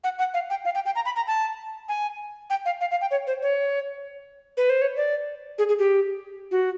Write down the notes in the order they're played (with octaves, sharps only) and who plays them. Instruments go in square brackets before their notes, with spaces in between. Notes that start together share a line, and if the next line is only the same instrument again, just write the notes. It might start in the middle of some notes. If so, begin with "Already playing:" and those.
[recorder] F#5
F#5
F5
G5
F5
G5
G5
A#5
B5
A#5
A5
G#5
G5
F5
F5
F5
G5
C#5
C5
C#5
B4
C5
C#5
D5
G#4
G#4
G4
F#4